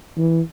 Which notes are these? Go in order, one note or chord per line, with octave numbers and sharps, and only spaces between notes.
E3